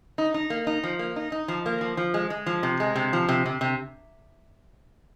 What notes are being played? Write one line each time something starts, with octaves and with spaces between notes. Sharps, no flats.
D#4
D#4
A#3
D#4
F3
A#3
D#4
D#4
F3
A#3
F3
F3
G#3
G#3
F3
C3
G#3
C3
F3
C3
C3
C3